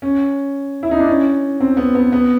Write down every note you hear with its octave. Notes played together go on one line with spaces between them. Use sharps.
C#4
E4
D#4
D4
C#4
C4
B3
B3
B3